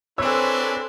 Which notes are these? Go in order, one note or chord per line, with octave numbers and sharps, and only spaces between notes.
C4 D4 E4 G#4 A4 B4 C#5 E6